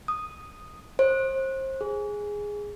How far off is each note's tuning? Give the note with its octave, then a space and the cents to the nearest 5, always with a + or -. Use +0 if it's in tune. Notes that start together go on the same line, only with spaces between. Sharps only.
D#6 -5
C5 +30
G#4 -5